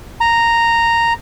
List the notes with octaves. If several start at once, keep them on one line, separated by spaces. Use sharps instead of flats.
A#5